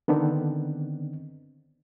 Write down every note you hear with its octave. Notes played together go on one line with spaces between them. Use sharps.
D3 D#3 B3 C4 D4 D#4